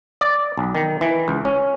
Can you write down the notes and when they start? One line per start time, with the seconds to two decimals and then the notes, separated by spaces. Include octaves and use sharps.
0.21 D5
0.58 B1
0.75 D#3
1.01 E3
1.28 C#2
1.45 C#4